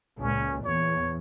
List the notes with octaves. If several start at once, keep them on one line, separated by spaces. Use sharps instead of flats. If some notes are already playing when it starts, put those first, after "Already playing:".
C#2 A#2 C#4
E2 C#5